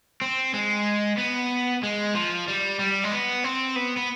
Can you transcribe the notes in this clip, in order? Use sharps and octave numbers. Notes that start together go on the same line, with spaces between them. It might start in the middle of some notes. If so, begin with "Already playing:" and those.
C4
G#3
B3
G#3
F3
G3
G3
G#3
B3
C4
B3
B3